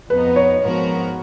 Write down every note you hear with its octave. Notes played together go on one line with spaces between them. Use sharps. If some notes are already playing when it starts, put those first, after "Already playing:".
F2 F3 B3 D#4 B4
C#5
G#2 F3 B3 F#4 A#4